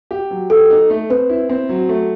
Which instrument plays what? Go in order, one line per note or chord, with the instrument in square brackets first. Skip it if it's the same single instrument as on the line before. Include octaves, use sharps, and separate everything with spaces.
[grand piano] G4
F#3
[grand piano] G4 [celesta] A4
[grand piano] D#4
A3
[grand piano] C4 [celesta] B4
[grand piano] E4
C4
F#3
A3